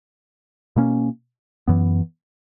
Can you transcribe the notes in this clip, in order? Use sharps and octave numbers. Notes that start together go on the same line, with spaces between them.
B2 A#3 C#4
F#2 E3 B3